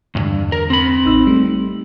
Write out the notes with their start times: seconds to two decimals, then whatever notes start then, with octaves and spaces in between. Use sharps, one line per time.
0.15 B1 E2 G2 D3
0.52 A#4
0.70 C4 B5
1.05 A1 D#4 E6
1.27 G3 A3